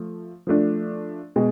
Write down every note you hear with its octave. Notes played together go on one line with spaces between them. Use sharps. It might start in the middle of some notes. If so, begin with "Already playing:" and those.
Already playing: F3 A3
F3 A3 D4
B2 G#3